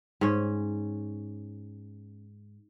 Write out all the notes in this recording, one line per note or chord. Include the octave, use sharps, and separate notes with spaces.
G#2 C#4